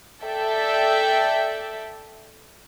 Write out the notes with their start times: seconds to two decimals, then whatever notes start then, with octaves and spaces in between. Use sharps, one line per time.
0.22 A4 D5 E5 G5